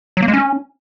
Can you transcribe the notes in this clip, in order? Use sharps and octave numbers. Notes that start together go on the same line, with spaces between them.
F#3
A#3
G#3
C#4